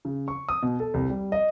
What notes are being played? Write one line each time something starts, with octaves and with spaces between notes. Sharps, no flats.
C#3
C#6
D#6
B2
A4
C2
G3
D#5